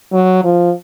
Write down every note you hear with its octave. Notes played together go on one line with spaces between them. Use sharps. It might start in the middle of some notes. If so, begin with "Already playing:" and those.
F#3
F3